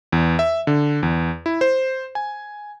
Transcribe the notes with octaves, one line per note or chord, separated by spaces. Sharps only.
E2
E5
D3
E2
E4
C5
G#5